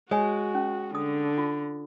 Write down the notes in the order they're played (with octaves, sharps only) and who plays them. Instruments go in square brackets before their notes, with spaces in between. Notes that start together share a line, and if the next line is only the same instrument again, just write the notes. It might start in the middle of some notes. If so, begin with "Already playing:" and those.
[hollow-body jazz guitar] G#3 [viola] F#4 [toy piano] C#5 G#5
[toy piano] C#4
[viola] D3 [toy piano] D#6
[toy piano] F4